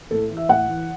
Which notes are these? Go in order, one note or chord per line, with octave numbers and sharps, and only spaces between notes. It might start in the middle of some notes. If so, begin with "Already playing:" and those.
A2 A4
E3
E5
A2 F#5
E3